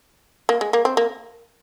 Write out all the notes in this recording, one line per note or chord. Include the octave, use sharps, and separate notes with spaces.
A#3
G#3
A#3
C4
A#3